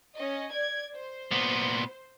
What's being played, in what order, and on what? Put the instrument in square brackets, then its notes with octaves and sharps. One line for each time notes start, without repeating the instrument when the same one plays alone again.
[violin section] C#4 D#5
D5 G#6
C5
[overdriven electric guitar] A#2 B3